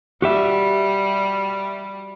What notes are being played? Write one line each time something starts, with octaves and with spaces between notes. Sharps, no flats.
G3 F#4 G4 E5